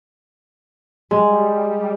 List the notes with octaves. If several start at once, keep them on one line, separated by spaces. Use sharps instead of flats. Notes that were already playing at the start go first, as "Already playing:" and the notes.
G3 G#3